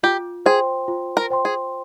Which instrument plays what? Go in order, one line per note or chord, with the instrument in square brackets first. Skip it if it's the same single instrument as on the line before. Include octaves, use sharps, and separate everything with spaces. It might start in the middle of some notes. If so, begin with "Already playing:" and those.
[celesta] F4 [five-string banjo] G4
[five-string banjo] G#4 [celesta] C5 G5 C6
[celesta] F4
[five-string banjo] A#4
[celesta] C5 G5 C6
[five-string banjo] G#4